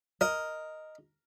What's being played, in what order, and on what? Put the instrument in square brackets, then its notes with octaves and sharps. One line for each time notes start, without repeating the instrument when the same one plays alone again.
[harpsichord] A#4 [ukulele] D#5